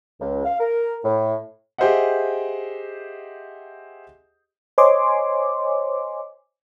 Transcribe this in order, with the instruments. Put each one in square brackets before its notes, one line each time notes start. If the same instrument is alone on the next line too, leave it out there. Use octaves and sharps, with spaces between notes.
[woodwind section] C#2
F5
A#4
A2
[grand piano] G4 G#4 C5 D#5 E5 F#5
[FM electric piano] C5 C#5 D#5 G#5 C6 D6